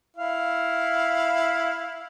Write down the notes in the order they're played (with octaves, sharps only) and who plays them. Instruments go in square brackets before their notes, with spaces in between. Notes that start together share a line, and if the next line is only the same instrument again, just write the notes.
[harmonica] E4 F5